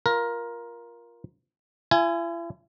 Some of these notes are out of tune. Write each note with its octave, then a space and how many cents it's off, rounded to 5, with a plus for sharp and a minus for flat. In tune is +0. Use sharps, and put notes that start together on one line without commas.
F4 +0 A#4 +15
E4 +45 G#5 +0